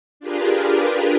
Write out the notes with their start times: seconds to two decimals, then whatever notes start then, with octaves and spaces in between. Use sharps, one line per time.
0.20 D4 F4 G4 G#4 A#4 B4